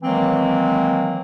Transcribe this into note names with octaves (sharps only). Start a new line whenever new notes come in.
D#3 E3 F#3 G#3 A#3 C4